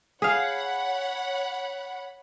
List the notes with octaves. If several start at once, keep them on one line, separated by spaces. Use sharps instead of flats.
G#4 C#5 F5 F#5 B5